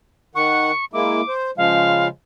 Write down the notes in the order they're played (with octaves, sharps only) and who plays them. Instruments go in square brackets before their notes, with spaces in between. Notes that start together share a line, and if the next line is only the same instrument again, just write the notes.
[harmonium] D#3 F#5 [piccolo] C#6
[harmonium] G#3 A#3 E4 [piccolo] D6
[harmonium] C5
[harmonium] C#3 F3 G#3 [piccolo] F5